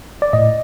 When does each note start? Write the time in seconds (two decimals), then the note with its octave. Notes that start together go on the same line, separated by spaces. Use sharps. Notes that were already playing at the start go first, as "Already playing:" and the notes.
0.22 D5
0.33 A2 D#5